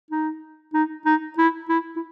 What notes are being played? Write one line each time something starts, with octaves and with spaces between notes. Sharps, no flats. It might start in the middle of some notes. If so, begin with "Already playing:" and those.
D#4
D#4
D#4
E4
E4
E4